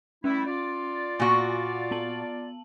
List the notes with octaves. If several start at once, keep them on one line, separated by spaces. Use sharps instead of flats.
G3 A3 C#4 E4
F4 D5
A#2 F#4 G#5 D6
B3 A5 F#7